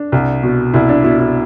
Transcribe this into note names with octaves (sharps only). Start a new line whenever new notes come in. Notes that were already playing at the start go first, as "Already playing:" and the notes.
Already playing: D4
C2
B2
C2 E4
D4
B2 E4
E4